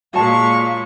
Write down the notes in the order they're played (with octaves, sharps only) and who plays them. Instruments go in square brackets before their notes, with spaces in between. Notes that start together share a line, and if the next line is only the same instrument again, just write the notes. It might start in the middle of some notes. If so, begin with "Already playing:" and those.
[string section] A#2 G#3 [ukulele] F#4 C#5 A5 [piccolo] F5 [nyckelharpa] C#6